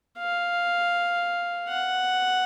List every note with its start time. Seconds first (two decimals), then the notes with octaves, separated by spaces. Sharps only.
0.19 F5
1.69 F#5